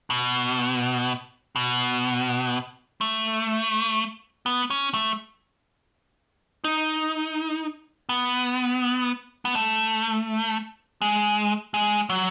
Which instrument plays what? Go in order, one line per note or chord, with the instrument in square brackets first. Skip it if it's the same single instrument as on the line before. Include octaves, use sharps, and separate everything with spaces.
[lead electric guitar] B2
B2
A3
B3
C#4
A3
D#4
B3
B3
A3
G#3
G#3
F#3